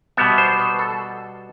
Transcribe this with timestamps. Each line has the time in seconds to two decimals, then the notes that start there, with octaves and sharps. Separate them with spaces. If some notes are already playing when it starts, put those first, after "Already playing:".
0.17 B2 G3 B3 E5
0.38 C5
0.60 B4
0.79 A4